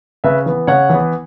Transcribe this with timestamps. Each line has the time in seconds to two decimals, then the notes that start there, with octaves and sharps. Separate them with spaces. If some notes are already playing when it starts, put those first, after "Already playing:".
0.24 C#3 B4 E5
0.46 E3 B3
0.67 C#3 C#5 F#5
0.90 E3 B3